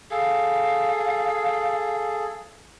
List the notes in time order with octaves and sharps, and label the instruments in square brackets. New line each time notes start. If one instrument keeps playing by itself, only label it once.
[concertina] G#4 A4 [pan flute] F5